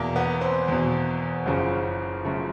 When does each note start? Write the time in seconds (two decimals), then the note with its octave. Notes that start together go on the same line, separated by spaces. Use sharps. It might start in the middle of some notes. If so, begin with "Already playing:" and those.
Already playing: E2 B2 A#3
0.16 B3
0.41 C4
0.68 E2 B2
1.46 F#1 F#2 C#3 F3
2.23 F#2 C#3 F3 A3